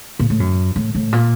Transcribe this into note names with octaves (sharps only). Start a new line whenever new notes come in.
A#2
A2
F#2
A2
A2
A#2